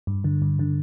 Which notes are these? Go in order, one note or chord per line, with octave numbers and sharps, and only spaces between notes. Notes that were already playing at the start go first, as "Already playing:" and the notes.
G2
D3
G2
D3